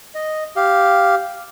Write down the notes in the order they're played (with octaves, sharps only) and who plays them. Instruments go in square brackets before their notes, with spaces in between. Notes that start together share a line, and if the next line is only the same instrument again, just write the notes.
[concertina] D#5
G4 F5